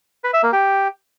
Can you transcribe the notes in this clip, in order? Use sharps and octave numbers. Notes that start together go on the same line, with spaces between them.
B4
E5
A#3
G4